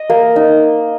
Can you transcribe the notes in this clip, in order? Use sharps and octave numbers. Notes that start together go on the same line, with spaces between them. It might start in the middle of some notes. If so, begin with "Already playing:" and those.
Already playing: D#5
A#3
D#4